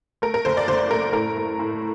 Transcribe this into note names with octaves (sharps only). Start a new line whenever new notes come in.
A3 A#4
A#4
F#1 C5
D5
F#1 C5
A3 A#4
A2 A#4
A3
A2